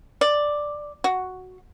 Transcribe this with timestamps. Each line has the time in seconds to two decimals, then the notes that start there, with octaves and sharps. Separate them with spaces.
0.21 D5
1.04 F#4